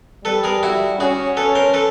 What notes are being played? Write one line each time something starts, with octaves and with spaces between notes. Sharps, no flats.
G3 A4 B4
G#4 A#4
E4 F#4
C#4 F#4 G#4
A4 B4
A#4 C5
A4 B4